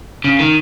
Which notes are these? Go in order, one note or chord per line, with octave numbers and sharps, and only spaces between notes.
C#3
D#3